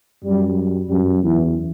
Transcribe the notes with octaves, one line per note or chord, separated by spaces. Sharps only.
F#2 G3
F#2 G3
E2 E3